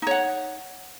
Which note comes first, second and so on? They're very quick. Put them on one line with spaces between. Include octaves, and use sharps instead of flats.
D#4 C#5 F#5